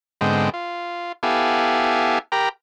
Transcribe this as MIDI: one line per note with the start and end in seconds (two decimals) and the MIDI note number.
0.21 0.50 44
0.21 0.50 50
0.21 0.50 56
0.21 0.50 59
0.21 0.50 60
0.21 0.50 79
0.53 1.12 65
1.23 2.19 59
1.23 2.19 64
1.23 2.19 67
1.23 2.19 69
1.23 2.19 77
1.23 2.19 80
2.32 2.49 67
2.32 2.49 70
2.32 2.49 79
2.32 2.49 82
2.32 2.49 83